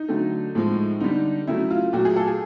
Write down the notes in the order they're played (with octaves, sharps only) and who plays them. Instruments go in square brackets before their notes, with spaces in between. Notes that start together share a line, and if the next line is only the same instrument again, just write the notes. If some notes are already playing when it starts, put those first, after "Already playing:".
Already playing: [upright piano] D#4
D3 F#3 A3
A2 F3 G#3
D3 G3 D#4
C#3 F#3 A3 E4
F4
A#2 F#3 A3 F#4
G#4
A4
G#4